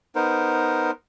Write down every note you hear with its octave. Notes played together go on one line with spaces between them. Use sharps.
B3 D#4 A#4 C5